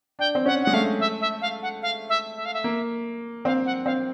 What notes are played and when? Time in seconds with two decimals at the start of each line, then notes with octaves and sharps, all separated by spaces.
0.19 D4 G5
0.35 C4
0.46 C#4 F#5
0.63 G#3 F#5
0.74 A3 F5
1.00 E5
1.21 E5
1.42 F5
1.62 F#5
1.82 F5
2.09 E5
2.36 E5
2.45 F5
2.54 E5
2.64 A#3
3.45 C4 F5
3.66 F#5
3.85 C4 F5